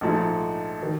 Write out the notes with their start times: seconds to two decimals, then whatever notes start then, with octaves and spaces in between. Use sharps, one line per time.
0.01 A#1 G#2 F3 A3
0.83 D#3